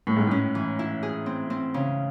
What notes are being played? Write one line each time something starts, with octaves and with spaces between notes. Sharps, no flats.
A2 A3
G#2
A2 C#4
E3
E4
G#4
C4
C4
C#3